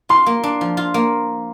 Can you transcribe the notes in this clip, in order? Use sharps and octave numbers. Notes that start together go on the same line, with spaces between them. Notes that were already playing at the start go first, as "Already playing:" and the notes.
F4 C6
A#3
D4
F3
F4
A#3